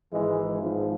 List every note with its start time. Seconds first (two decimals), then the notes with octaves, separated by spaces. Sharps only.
0.12 G#1 G#2 E3 G#3
0.63 G#1 G#2 F3